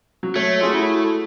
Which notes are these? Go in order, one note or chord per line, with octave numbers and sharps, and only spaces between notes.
F#3
A3 C#5
F4 F#4 G#4 E5
E4